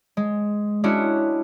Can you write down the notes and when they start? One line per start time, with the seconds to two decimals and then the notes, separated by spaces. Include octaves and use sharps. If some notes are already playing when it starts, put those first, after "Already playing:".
0.17 G#3
0.84 G#3 C#4 D4 E4 F#4